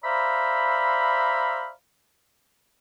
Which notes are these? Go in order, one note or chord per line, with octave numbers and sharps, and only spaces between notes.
C5 D5 E5 F5 A#5 B5